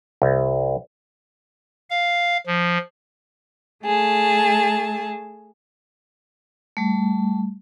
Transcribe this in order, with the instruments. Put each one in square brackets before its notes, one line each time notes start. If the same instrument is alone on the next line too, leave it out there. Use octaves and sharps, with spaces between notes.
[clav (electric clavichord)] C2
[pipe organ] F5
F3
[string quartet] A3 G#4 A5
[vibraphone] G3 A3